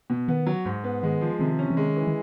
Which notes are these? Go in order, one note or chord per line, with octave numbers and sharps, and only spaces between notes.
B2
D#3 B3
F#3
G#2
B3
D#3 G#3
F3
C3 D#3
C#4
E3
D#3 G#3
E3
D#3